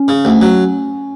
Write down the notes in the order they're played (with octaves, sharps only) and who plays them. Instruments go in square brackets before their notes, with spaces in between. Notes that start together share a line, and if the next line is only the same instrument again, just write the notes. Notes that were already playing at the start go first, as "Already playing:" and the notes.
Already playing: [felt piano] C#4
[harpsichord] C#3
D2
F#3